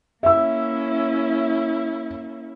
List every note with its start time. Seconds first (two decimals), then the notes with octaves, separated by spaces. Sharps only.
0.23 A#3 C#4 E4 E5 E6